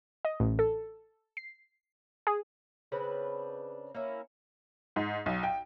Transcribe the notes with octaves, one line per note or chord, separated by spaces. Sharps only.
D#5
A1
A4
C7
G#4
C#3 C4 D4 B4
A#3 C#4 E4
G#2
B1
G5